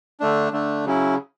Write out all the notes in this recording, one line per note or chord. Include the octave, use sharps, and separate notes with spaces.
D3 A3 D4
D3 A3 D4
C#3 F#3 C#4 E4